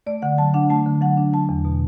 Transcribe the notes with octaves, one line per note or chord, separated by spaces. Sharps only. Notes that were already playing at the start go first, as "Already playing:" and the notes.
A3 D5
D3 F#5
F#3 A5
D4 F#5
A3 A5
D3
F#3 F#5
D4
F#3 A5
E2
B2